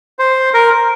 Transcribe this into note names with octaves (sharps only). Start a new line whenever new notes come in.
C5
A#4